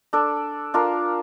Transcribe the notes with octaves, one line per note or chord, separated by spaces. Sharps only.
D4 A4 D5
D4 F4 A#4 F5